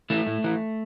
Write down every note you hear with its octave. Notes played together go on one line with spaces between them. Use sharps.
E3 A3
A2
E3